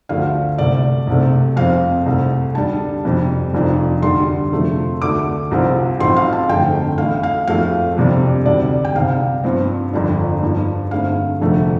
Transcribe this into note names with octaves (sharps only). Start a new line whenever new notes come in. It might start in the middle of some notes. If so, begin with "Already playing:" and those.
D2 D3 F3 A3 D4 F5
C2 C3 A3 D5
C2 C3 A3
F2 F3 C4 F5
C2 C3 A3
D2 D3 G3 D4 A5
F2 C3 G3
F1 F2 F3 D4
D2 D3 G3 D4 C6
F2 C3 F3 A3
D2 D3 A3 D4 D6
C2 C3 F3 C4
A1 A2 F3 C4 C6
F5
A5
G1 F2 D3 A3 C4 G5
A1 A2 A3 F5
F5
F2 F3 A3 F5
F2 C3 G3 D4
D2 C3 G3 D4 D5
G5
C2 C3 G3 F5
G2 F3 C4
G1 F2 F3 D4
G2 F3 D4
G2 D3 A3 C4 F5
F1 F2 D3 A3